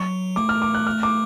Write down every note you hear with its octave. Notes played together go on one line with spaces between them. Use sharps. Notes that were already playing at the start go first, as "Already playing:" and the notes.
Already playing: F#3 C#6
A3 D6
F6
D6
F#6
F6
D6